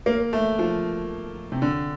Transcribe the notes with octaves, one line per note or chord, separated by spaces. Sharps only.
A#3
A3
F3
C3
D3